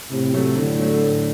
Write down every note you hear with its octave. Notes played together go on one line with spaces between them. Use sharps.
A2 C3
F#3 A3
A2 D3
F#3 A3
A2